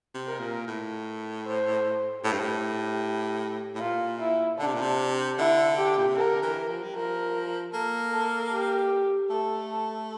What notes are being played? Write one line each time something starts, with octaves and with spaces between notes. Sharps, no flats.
C3
A#4
A#2
A2
C5
A2 G4
G2
A2
A2
A#2 F4
E4
D3 D4
C3
A#2
C3
D3 E4
G4
A#2
C3
D3 A#4
E3
F3
G3
F3 A#4
A#3 A4
A4
G4
A3 A4